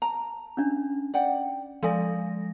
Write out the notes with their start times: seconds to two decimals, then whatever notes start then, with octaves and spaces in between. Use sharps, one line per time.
0.02 A5 A#5
0.57 C#4 D4
1.14 D5 F#5 G5
1.83 F3 G#3 A4 D5 G#5 A#6